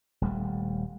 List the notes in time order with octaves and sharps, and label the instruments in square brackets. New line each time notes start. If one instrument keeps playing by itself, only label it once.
[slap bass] D#1 G3 A3